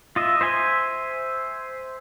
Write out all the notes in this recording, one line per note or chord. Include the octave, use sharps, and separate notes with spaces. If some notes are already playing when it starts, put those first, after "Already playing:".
F4 D#5 E5
C5 E5 G#5 C6